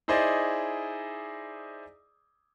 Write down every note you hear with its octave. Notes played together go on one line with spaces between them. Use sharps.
D#4 E4 G#4 C5 D5 D#5